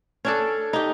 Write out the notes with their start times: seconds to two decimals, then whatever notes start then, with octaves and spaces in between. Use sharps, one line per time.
0.25 C#4 D4 A4
0.73 D#4 G4